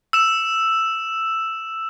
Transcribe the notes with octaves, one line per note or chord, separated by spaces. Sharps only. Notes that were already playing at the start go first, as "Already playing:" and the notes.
E6 E7